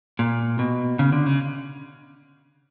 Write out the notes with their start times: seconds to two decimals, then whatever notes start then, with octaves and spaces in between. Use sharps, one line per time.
0.19 A#2
0.59 B2
0.99 C#3
1.12 D3
1.26 C#3